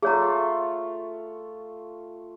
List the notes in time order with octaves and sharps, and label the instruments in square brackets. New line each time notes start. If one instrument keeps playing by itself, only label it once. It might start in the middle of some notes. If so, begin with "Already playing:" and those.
[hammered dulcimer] A3 F4 [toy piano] G#4 C#5 A#5